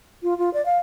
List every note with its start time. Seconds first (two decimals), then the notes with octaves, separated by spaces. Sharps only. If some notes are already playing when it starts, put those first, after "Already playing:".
0.23 F4
0.38 F4
0.54 D5
0.66 F5